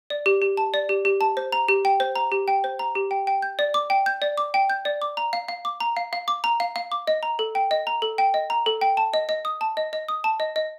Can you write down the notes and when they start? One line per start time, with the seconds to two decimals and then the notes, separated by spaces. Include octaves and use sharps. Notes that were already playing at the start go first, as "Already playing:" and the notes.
0.10 D5
0.26 G4
0.42 G4
0.57 A5
0.74 D5
0.89 G4
1.05 G4
1.21 A5
1.37 C5
1.52 A#5
1.68 G4
1.85 G5
2.00 C5
2.16 A#5
2.32 G4
2.48 G5
2.64 C5
2.79 A#5
2.95 G4
3.11 G5
3.27 G5
3.42 G6
3.59 D5
3.74 D6
3.90 G5
4.06 G6
4.22 D5
4.38 D6
4.54 G5
4.70 G6
4.85 D5
5.02 D6
5.17 A#5
5.33 F5
5.48 F5
5.65 D6
5.80 A#5
5.97 F5
6.13 F5
6.28 D6
6.44 A#5
6.60 F5
6.76 F5
6.92 D6
7.07 D#5
7.23 A#5
7.39 A4
7.55 G5
7.71 D#5
7.87 A#5
8.02 A4
8.18 G5
8.34 D#5
8.50 A#5
8.66 A4
8.81 G5
8.97 A5
9.14 D#5
9.29 D#5
9.45 D#6
9.61 A5
9.77 D#5
9.93 D#5
10.08 D#6
10.24 A5
10.40 D#5
10.56 D#5